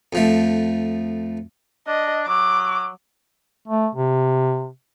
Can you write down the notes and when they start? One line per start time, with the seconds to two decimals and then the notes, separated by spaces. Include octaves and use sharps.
0.13 F2 F3 A3
1.87 D4 D#5
2.28 F#3 D6
3.68 A3
3.95 C3